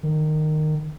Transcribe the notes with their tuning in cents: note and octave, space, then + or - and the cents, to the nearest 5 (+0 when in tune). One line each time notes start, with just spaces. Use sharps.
D#3 -15